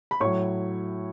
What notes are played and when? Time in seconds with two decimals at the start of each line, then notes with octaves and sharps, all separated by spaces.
0.11 B5
0.20 A2 F#3 C#5 C#6